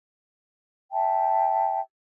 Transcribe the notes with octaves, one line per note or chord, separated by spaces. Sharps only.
E5 G5 A5